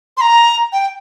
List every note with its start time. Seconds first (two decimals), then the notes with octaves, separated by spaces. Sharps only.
0.17 C6
0.21 A#5
0.72 G5